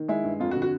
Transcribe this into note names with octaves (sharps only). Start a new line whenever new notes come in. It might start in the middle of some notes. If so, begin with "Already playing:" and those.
Already playing: D#3
G#3 E4
G2
F2 F4
F#4
D3
F#4